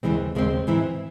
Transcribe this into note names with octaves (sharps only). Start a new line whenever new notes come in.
D#2 C#3 E3 G#3 C4
D#2 C#3 G#3 C4
G#2 E3 C4 E4